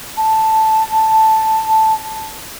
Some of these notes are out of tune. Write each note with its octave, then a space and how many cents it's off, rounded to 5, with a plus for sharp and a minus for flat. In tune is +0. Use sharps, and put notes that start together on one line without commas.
A5 +0